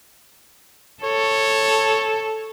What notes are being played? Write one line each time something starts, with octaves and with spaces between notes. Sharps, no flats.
A4 C#5